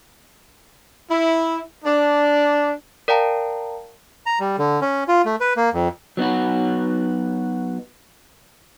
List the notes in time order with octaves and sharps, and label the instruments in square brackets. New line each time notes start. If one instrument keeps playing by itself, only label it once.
[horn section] E4
D4
[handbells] A#4 D5 F5 G5 A5 A#5
[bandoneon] A#5
G3
D3
C#4
F4
A3
B4
A#3
F2
[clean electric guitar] F#3 B3 D#4 F#4